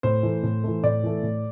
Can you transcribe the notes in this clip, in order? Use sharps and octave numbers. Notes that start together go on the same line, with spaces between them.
A2 C5
E3 A3
A2
E3 A3
A2 D5
E3 A3
A2